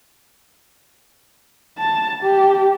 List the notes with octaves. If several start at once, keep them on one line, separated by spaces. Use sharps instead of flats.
A5
G4